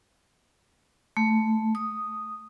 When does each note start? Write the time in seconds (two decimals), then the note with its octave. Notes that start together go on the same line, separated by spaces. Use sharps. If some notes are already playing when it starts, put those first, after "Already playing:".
1.17 A3
1.75 D#6